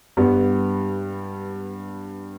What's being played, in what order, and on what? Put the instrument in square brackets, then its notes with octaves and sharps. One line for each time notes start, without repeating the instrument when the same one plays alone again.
[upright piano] G2 G3 B3